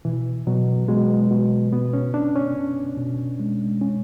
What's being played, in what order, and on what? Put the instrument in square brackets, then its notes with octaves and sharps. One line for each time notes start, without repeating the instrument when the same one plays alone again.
[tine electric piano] B2 [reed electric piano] E3
[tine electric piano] B2 [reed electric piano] F#3
[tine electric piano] B2 [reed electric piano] G#3
[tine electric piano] B2
[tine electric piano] B2 [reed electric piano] B3
[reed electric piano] C#4
[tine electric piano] B2 [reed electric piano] D4
[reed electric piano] C#4
[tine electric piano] B2
B2
G#3
C#4